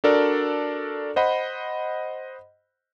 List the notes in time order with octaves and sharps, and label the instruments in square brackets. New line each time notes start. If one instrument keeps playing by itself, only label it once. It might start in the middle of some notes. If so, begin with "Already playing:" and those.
[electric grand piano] D4 F#4 A4 A#4 D5
C5 D#5 F#5 B5